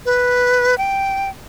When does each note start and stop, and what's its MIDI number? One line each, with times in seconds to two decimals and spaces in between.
0.05 0.77 71
0.78 1.29 79